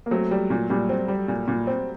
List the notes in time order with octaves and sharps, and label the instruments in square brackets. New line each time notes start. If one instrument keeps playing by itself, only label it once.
[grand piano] A#3
[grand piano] F#3 A3 [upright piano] C4
[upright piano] G3
A#2
[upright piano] A#2 [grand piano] G3
[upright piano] C4
G3
A#2
A#2
C4